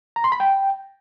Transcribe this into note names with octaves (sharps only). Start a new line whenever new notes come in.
A#5
C6
B5
G5